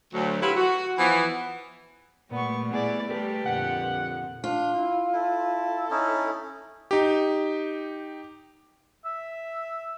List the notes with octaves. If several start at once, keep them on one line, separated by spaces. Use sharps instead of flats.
D2 F#3
F#3 G3 E4 F4 G4 B4
F#4
E3 F3 B3
A#2 G3 A3 B3 C#6
B3 E4 G#4 D5
G3 A3 G4 A4 B4
F2 A#2 D3 F#5
D4 F4
E4
E4 A4
C#4 D#4 E4
D#4 G4
E5